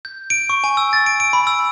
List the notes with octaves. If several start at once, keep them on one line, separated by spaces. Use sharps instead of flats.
G6
D7
C#6
G#5
E6
A6
D7
D7
B5
E6